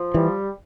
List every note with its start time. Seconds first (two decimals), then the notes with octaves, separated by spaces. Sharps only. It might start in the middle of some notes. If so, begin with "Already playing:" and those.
Already playing: F3
0.14 E3 G3